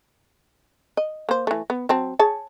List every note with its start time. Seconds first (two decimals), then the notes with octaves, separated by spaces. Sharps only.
0.97 D#5
1.29 A#3 C5
1.47 E3 A3
1.70 B3
1.89 F#3 C4 A5
2.19 G#4 C#5 A5